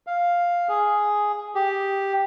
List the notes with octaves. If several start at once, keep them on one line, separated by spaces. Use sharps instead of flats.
F5
G#4
G4